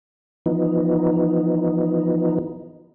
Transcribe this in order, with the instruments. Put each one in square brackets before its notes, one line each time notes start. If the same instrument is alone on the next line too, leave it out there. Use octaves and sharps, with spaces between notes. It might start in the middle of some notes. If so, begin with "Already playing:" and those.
[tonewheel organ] E3 F3 B3 D#4